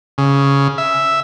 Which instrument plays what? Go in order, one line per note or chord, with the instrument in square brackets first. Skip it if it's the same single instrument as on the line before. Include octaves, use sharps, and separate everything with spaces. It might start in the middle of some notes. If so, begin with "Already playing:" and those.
[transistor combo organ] C#3
E5